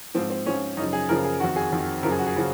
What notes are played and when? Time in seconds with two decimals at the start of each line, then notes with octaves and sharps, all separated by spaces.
0.15 G#2 F3 C4
0.30 C4
0.46 G#2 F3 C#4
0.77 F#2 C#3 F3 D#4
0.93 G#4
1.09 F#2 C#3 F3 A#4
1.24 G#4
1.40 F2 D#3 F#4
1.56 G#4
1.72 F2 D#3
2.03 F#2 C#3 F3 A#4
2.11 G#4
2.19 F#4
2.27 G#4
2.37 C#3 F3